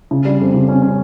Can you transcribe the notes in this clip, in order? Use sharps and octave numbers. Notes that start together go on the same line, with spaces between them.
C#3
G3
F2
C#3
C#4
C#4